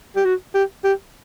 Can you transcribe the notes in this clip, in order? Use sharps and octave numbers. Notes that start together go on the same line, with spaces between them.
G4
F#4
G4
G4